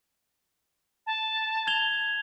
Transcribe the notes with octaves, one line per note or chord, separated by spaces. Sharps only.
A5
G#6 F7 G7